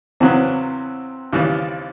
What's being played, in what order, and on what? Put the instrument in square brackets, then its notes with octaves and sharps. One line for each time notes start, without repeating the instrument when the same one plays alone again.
[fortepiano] E2 C#3 F#3 B3 [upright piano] C4
[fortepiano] D#2 C#3 E3 G3